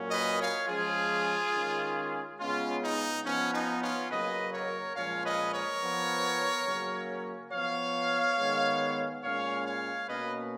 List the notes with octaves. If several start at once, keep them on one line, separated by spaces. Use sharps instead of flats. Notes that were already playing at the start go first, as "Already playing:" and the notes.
Already playing: A#2 F#3 A#3 C#4
B4 D#5
C#5 F5
F3 G#3 C#4 F4 G#4
D#3 G#3 C#4
C#3 G#3 B3 C#4 F4
D#4
F3 B3 C#4
D#4
C#4 F4
C#3 F#3 A#3 B4 D#5
A#4 C#5
A#2 F3 G#3 C#4 C#5 F5
B4 D#5
A#4 C#5
F3 B3
C#3 F#3 A#3 C#4
F3 B3 C#5 F5
D#3 G#3 B3
A#2 G#3 C#4 C#5 F5
C#5 F5
B2 A#3 C#4 B4 D#5